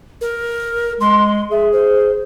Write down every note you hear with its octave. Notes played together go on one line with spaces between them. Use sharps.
A#4
G#3 C6
G#4 E5
C5